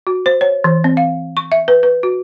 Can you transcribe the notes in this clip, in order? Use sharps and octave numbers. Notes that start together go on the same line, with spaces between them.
F#4
C5
C#5
E3
C4
F5
C#6
E5
B4
B4
F#4